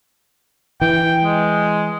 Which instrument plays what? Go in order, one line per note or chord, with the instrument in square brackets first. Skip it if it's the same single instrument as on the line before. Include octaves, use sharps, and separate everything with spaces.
[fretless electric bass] E3 [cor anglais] G5
[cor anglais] G#3